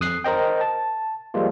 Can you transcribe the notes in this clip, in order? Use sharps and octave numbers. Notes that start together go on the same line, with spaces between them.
F2 D#6 F#6 C7
A#4 C5 D#5 G5
A5
F3 G3 G#3 A#3 F4